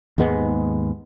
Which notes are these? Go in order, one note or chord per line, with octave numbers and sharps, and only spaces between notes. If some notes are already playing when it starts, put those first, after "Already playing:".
D#2 G#2 G#3 B3